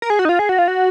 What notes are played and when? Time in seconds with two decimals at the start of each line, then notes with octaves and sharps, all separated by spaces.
0.02 A#4
0.10 G#4
0.19 F#4
0.25 D#4
0.29 F4
0.39 G#4
0.49 F#4
0.59 F4
0.68 F#4